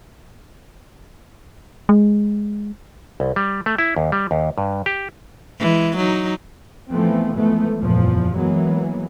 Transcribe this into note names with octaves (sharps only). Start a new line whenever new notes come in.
G#3
C2
G3
A3
E4
D#2
G3
D#2
G2
G4
E3 G#3
F#3 D#4
E3 F3 A3 B3 C4
E3 F3 G#3 A3 B3
F#1 E2 A#2 F3
E3 F#3 G#3 A#3 B3